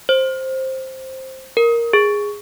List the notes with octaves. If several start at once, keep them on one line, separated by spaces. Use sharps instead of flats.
C5
A#4
G#4